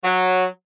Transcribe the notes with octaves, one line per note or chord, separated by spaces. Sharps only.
F#3